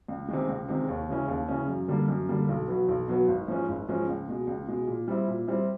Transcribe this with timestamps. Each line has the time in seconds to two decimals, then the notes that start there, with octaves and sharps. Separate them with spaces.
0.08 C#2
0.28 C3 D#3 G#3
0.48 C#2
0.69 C3 D#3 G#3
0.89 D#2
1.09 C#3 E3 G#3 C#4
1.28 D#2
1.48 C#3 E3 G#3 C#4
1.68 F#2
1.88 D3 G3 A#3
2.08 F#2
2.28 D3 G3 A#3
2.49 B1
2.68 B2 F#3 B3
2.88 B1
3.08 B2 F#3 B3
3.28 G#1
3.48 G#2 F3 G#3 C#4
3.68 G#1
3.89 G#2 F3 G#3 C#4
4.08 C#2
4.28 B2 G#3
4.47 C#2
4.68 B2 G#3
4.87 A#2
5.08 G3 C4 E4
5.28 A#2
5.47 G3 C4 E4